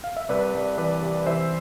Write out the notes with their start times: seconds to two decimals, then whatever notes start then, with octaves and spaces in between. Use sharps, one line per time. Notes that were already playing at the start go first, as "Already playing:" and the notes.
0.04 F5
0.17 E5
0.29 C2 B4 D5
0.54 C2
0.78 E3 B4 D5
1.02 C3
1.26 E3 C5 E5